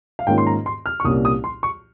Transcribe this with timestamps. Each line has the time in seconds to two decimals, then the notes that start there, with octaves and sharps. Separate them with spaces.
0.19 F5
0.27 G#2 D#3 A#3 C#4 F4 G5
0.38 C6
0.47 A#5
0.66 C6
0.86 F6
1.00 C#6
1.05 C2 A#2 G3 A#3 C#4 D#6
1.25 D#6
1.44 C6
1.63 C#6